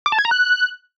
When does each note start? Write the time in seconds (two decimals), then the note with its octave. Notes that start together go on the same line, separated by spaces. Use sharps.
0.06 D6
0.12 A5
0.19 G#6
0.25 A#5
0.31 F#6